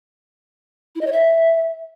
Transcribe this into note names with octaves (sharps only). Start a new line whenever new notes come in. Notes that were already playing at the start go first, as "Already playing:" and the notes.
E4
D#5
C#5
E5